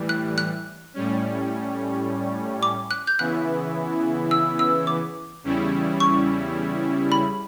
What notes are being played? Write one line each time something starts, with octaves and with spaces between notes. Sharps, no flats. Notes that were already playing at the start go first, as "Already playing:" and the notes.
Already playing: A2 E3 G3
F#6
F#6
A2 G3 C#4
D6
F#6
G6
C#3 E3 B3 E4 F#6
E6
E6
D6
E2 C#3 G3 C#4 E4
C#6
B5